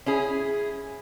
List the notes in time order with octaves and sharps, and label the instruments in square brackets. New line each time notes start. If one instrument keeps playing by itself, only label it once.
[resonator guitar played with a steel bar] C#4 E4 G#4